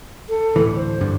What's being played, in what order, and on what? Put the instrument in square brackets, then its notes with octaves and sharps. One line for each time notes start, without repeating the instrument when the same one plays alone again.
[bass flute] A4
[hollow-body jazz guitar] D2 A2 E3
[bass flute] C5
[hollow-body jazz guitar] G2 D3